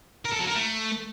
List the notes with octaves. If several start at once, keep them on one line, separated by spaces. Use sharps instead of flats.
A#4
A4
F#3
A#4
A3